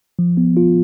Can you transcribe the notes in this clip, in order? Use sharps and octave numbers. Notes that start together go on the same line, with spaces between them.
F3
B3
F4